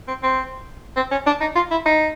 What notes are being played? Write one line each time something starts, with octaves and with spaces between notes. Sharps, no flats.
C4
C4
C4
C#4
D4
D#4
F4
E4
D#4